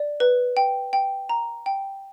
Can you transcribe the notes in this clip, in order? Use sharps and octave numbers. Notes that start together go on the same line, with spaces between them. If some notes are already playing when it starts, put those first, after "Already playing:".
Already playing: D5
B4
G5
G5
A#5
G5